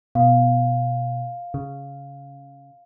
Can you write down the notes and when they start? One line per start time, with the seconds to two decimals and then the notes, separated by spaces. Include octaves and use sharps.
0.15 B2 F5
1.54 C#3